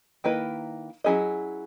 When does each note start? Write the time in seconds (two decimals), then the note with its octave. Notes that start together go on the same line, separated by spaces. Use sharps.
0.24 D#3 A#3 E4 B4 D#5
1.04 F#3 C#4 E4 G#4 D#5